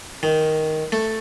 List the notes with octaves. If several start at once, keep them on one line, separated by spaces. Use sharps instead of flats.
D#3
A3